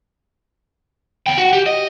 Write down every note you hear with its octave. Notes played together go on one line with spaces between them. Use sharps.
E2 G5
F#4
G4
D#5